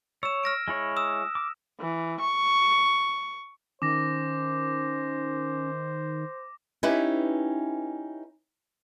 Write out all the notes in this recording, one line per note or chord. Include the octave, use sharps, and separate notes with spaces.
C#5 E6 E7
F6 A#6 D7
G#3 E4 C#5
D#6 E6 E7
D6
E3
C#6
D#3 C#4 C5 D6 A#6
C#4 D#4 E4 G4 B4